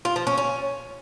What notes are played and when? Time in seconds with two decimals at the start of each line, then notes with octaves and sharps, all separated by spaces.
0.05 F4
0.16 F3
0.27 C#4
0.38 C#4